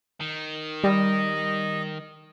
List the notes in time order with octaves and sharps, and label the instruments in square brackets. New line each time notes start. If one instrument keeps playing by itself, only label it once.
[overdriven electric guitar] D#3
[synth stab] G3 [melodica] D#5